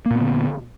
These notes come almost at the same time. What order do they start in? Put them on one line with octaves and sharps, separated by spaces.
A#3 A#2 B3 D3